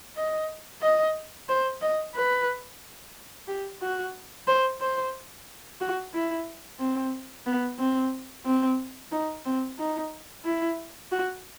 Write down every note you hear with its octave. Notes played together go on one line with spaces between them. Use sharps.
D#5
D#5
C5
D#5
B4
G4
F#4
C5
C5
F#4
E4
C4
B3
C4
C4
D#4
C4
D#4
E4
F#4